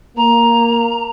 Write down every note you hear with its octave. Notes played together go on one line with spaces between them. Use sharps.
A#3 A#5